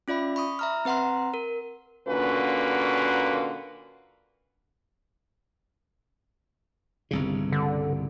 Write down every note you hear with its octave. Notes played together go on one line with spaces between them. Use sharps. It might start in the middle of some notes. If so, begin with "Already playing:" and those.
C#4 F4 D5 E5 B5
B5 C#6 D#6
E5 A#5 F6
C4 B4 F#5 A#5 C6
A#4
A#2 D3 A#3 C#4 F#4 B4
G1 C2 C#3
D3